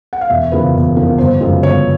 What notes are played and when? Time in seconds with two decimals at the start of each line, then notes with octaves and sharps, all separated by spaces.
0.13 F#5
0.21 F5
0.30 E1 E5
0.52 E2 C#3 F3 A#3 B4
0.74 E1
0.96 E2 C#3 F3 A#3
1.18 G1 C5
1.41 F#2 C#3 F3 G#3
1.63 G1 C#5